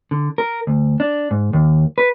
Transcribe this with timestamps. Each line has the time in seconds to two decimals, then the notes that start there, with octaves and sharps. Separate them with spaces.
0.11 D3
0.38 A#4
0.67 D2
1.00 D4
1.31 G#2
1.53 D#2
1.98 B4